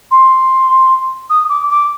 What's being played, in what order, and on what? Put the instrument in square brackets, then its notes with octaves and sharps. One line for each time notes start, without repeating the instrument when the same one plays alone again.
[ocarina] C6
D#6
D6
D6